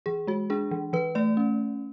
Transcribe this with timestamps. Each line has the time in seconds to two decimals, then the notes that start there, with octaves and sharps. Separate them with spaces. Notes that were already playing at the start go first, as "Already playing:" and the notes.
0.06 E3 G#4
0.27 G#3 F#4
0.50 D4 G#4
0.71 E3
0.93 E3 B4
1.15 A3 D5
1.37 C#4